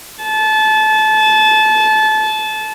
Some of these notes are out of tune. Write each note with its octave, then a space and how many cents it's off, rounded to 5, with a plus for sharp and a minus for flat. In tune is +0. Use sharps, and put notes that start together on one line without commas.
A5 -25